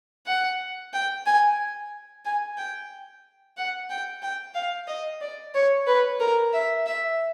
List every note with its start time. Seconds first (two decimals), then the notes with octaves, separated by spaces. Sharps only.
0.26 F#5
0.93 G5
1.26 G#5
2.25 G#5
2.58 G5
3.57 F#5
3.90 G5
4.22 G5
4.55 F5
4.88 D#5
5.21 D5
5.55 C#5
5.87 B4
6.20 A#4
6.53 E5
6.86 E5